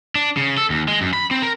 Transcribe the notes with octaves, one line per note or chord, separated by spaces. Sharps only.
D4
C#3
A4
D#2
G#3
F#2
B5
C4
A#4